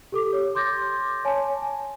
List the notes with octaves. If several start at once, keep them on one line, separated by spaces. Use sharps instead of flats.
G4 A4 D6
C#5
C6 D6 G6 A6 A#6
C#5 G#5 A5
G#5